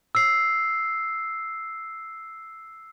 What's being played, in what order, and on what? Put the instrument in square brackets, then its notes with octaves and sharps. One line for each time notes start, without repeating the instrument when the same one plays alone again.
[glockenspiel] E6 C7